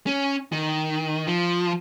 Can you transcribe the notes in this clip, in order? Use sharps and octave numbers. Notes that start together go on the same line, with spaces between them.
C#4
D#3
F3